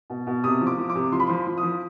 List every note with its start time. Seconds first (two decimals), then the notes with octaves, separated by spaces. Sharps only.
0.10 B2
0.27 B2
0.44 C3 D#6
0.61 F3
0.67 D6
0.78 F3
0.90 D6
0.95 C3
1.12 F3 C6
1.20 B5
1.27 F3 C6
1.47 F3
1.58 D#6
1.63 F3